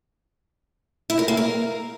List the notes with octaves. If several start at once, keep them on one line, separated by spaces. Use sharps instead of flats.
E4
A#4
A#3
A#4